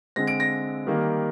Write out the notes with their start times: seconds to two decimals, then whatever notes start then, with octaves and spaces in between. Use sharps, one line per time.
0.16 D3 G#3 C4 A#6
0.27 D7
0.40 A#6
0.87 D#3 G3 A#3